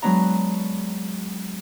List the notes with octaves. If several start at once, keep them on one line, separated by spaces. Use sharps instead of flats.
F#3 G#3 B3 D4 A#5